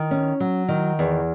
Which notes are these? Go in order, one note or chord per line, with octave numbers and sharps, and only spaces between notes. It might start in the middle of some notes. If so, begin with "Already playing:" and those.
Already playing: D#3
C#4
F#3
D#3
E2